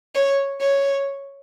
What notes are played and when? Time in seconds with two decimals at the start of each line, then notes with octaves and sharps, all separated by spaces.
0.15 C#5
0.61 C#5